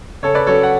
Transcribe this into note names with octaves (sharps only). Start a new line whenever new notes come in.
C#3 A4 C#5
B4 D5
F#3 C#4 A4 C#5
F#5